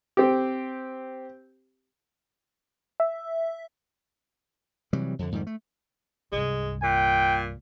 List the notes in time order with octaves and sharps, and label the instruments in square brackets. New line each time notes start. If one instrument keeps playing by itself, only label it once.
[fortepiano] C4 G4
[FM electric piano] E5
[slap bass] C3 E3 F#3 G3
F2 D3
F2 G#2 D#3 G3
A3
[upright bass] C2 G2 [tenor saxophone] G#3
[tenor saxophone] A#2 [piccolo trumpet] G5